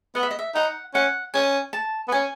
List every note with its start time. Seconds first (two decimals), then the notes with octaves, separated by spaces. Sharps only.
0.15 B3 F#5
0.23 E5
0.31 D#5
0.39 E5
0.55 D#4 F#5
0.94 C#4 F#5
1.34 C#4 G#5
1.73 A5
2.08 B3
2.12 C#4 G#5